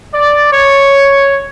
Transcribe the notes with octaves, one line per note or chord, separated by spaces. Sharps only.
D5
C#5